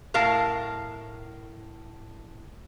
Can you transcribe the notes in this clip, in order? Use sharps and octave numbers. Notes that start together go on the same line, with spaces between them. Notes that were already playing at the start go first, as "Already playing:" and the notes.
A2 A#4 F5 A5